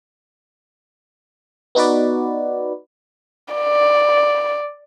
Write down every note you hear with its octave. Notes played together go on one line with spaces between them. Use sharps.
B3 D#4 F#4 B4 D5
D5